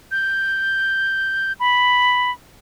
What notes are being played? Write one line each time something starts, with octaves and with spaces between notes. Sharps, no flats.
G6
B5